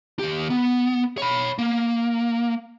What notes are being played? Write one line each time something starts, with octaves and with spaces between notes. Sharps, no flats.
D#2 G4
B3
C#5 B5
A#3